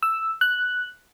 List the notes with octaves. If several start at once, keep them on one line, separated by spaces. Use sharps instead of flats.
E6
F#6